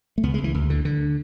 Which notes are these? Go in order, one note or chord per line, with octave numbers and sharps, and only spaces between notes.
A3
C#2 B3
G#3
C#2
E3
D2
D3
D3